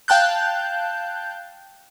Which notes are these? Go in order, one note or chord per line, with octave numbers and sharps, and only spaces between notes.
F5 G5 A5 F#6 G6